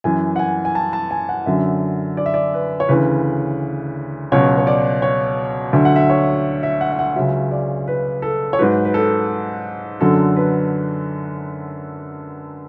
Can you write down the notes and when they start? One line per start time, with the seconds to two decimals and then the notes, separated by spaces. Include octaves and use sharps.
0.04 F#2 E3 G#5
0.36 F#5
0.39 G#5
0.65 G#5
0.75 A5
0.93 A5
1.11 G#5
1.29 F#5
1.46 F#2 D3 F#3 E5
2.17 D5
2.26 E5
2.34 D5
2.54 B4
2.80 C#5
2.89 D2 C#3 E3 B4
4.32 C#2 B2 F#3 C#5
4.58 C#5
4.67 D5
5.02 C#5
5.73 D2 D3 F#3 E5
5.85 F#5
5.96 E5
6.10 C#5
6.63 E5
6.81 F#5
6.92 E5
6.99 F#5
7.16 C#2 C#3 F#3 E5
7.51 D5
7.88 B4
8.22 A4
8.53 C#5
8.59 G#2 F#3 B4
8.85 B4
8.94 A4
10.01 F#2 D3 F#3 A4
10.36 B4